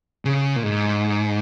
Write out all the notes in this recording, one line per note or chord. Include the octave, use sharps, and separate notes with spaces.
C#3
A#2
G#2